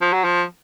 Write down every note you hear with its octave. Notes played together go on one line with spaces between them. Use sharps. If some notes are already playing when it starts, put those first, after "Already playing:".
F3
F#3
F3